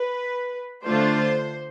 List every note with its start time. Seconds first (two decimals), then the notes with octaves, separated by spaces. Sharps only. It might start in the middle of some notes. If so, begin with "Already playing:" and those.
Already playing: B4
0.85 D3 A3 D4 F4 C5